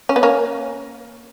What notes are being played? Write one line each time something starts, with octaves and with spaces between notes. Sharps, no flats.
C#4
B3
A#3 C#4